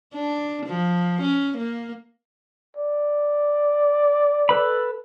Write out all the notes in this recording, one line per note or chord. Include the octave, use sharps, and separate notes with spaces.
D4
F3
C#4
A#3
D5
A4 B4 B5